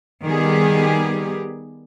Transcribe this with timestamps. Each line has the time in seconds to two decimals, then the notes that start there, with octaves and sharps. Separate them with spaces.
0.23 D#3 G3 B3 G4 G#4